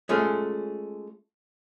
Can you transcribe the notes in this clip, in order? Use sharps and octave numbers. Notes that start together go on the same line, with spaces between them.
G#3 A3 C#4 F4